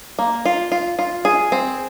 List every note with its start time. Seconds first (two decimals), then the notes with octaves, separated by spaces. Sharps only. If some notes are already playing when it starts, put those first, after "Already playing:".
0.19 A#3
0.46 F4
0.72 F4
0.99 F4
1.25 G#4
1.52 C4